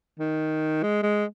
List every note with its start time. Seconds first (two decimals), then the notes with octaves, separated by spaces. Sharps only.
0.19 D#3
0.83 G#3
1.03 G#3